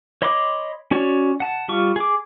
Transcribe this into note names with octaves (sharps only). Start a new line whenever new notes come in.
C#5 D#5 B5 C6 D6
C#4 F#4 C#5 D5
F#5 A5
G3 F4 C#6
G#4 D6